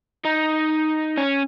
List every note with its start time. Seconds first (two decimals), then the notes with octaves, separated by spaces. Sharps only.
0.25 D#4
1.18 C#4